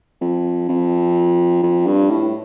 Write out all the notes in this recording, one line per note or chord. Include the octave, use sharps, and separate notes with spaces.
F2
F2
F2
G2
A2